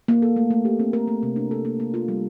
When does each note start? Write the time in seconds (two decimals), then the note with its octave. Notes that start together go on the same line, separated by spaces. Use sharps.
0.08 A#3
0.22 A4
0.36 A3
0.51 A3
0.65 G4
0.80 C4
0.93 A#4
1.08 A3
1.23 C3
1.36 D4
1.51 A4
1.65 A#3
1.80 A#3
1.94 F4
2.08 G3